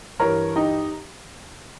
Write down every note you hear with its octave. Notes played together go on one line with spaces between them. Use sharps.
G2 E3 A#4 C#5
D#4 G4